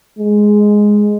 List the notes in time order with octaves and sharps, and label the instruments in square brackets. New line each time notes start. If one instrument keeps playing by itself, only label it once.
[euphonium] G#3